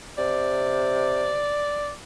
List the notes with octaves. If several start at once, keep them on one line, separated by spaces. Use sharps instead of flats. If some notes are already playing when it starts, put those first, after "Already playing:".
C3 D5